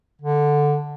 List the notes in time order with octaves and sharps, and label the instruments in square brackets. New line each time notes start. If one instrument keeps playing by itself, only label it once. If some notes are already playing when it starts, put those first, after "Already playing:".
[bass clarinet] D3